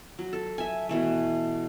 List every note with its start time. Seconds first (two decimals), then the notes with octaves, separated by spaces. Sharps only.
0.19 F#3
0.33 A4
0.58 E5 G#5
0.89 B2 E3 A3